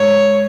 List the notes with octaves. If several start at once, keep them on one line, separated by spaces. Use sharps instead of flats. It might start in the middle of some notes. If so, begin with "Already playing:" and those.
Already playing: G#2 C#5